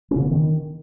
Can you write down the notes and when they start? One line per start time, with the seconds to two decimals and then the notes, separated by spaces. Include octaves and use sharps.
0.11 C#4
0.16 C#3
0.21 B3
0.26 C#3
0.31 D#3